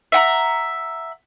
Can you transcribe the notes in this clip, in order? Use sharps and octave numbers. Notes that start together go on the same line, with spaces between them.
E5 F#5 A#5